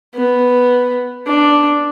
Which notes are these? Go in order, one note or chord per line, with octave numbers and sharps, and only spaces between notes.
B3
D4